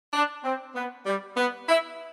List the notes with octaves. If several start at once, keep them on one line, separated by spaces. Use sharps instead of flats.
D4
C4
B3
G3
B3
E4